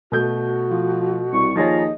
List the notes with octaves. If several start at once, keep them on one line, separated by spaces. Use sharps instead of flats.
B2 A3 F#4 G6
F3
C2 C#6
D#2 F3 F4 G#4 C#5 D#5 A#5